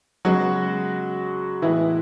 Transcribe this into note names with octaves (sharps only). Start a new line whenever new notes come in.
C#3 F#3 G#3 B3 F#4
A2 E3 G#3 B3 E4